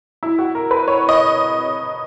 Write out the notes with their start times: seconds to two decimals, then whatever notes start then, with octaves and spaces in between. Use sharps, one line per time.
0.23 E4
0.39 F#4
0.55 A#4
0.71 B4
0.88 C#5
1.09 D#5